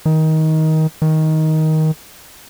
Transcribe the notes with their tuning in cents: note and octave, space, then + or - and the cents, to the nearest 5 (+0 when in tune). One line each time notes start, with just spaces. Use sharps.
D#3 +20
D#3 +15